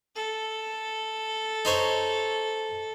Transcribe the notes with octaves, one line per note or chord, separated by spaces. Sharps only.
A4
D#4 C5 C#5